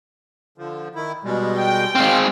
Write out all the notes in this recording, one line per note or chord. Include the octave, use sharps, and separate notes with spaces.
D3 F3
D#3 E4
B2 G3 G#3
G5
G#3 C4 F5